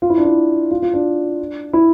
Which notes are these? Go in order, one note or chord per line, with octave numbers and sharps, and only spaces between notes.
F4
E4
D4
E4
F4
F4
D4
E4